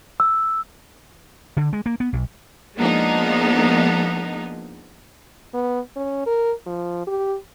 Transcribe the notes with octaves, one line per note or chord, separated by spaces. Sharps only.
E6
D3
G#3
A#3
B3
B1
F3 G#3 A#3 B3 D4 D#4
B3
C#4
A#4
F3
G4